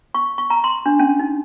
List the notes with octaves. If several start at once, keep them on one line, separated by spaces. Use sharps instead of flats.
C#6
C#6
A#5
C6
D4
C#4
D#4